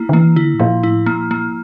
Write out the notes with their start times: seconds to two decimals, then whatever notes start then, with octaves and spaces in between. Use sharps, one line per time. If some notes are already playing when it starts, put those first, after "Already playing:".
Already playing: A#3 E4
0.09 D3
0.13 E3 A#3
0.36 D3 E4
0.54 A2
0.60 A#2 F3
0.83 A2 E4
1.06 A#2 A#3
1.31 A#3